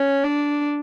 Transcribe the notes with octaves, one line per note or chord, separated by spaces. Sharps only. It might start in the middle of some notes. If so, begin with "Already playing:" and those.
Already playing: C#4
D4